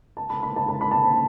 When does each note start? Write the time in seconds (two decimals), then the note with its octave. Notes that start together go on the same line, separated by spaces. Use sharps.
0.17 A5
0.30 B5
0.43 B5
0.56 A5
0.69 A5
0.81 B5
0.91 A5